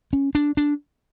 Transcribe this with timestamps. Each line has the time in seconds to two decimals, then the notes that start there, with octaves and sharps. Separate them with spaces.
0.13 C#4
0.35 D4
0.57 D4